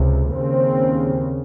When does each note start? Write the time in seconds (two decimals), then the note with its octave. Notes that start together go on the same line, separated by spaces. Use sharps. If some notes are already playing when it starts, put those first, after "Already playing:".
Already playing: C#2 C3
0.32 D#2 C#3 C4